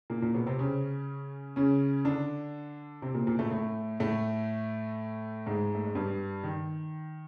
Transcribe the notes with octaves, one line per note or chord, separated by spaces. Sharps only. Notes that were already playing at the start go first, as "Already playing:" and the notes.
A#2 A#3
A#2 A#3
B2 B3
C3 C4
C#3 C#4
C#3 C#4
D3 D4
C3 C4
A#2 A#3
A#2 A#3
A2 A3
A2 A3
A2 A3
G#2 G#3
A3
G#3
G2 G3
D#3